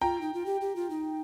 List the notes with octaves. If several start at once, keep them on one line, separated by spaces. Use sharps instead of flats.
F4 G5 A#5
D#4
F4
G4
G4
F4
D#4